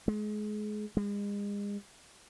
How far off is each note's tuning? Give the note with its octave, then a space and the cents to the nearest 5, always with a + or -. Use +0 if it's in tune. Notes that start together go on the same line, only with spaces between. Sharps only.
G#3 +30
G#3 -40